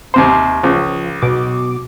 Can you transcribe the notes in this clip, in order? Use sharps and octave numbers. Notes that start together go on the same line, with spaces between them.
D#2 C3 C5
C#2 F3
B1 B2 D6